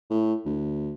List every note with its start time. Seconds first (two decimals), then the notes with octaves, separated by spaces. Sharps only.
0.10 A2
0.45 D2